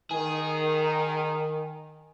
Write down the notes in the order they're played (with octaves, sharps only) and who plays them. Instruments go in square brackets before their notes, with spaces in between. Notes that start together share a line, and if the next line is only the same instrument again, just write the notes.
[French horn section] D#3 [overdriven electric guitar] G#4